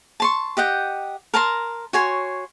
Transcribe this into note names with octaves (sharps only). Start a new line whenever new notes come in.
A5 C6 C#6
G4 D#5 F#5 G5
A#4 A5 A#5 C6
F#4 C#5 G#5 C6